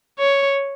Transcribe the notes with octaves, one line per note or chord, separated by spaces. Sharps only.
C#5